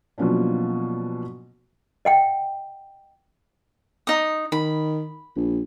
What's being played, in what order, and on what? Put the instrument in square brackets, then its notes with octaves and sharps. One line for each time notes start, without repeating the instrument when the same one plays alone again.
[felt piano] B2 F3 F#3 A#3 C#4 D4
[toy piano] D#5 F#5 G5
[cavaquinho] D#4 D#6
[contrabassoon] D#3 [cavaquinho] B5
[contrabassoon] A#1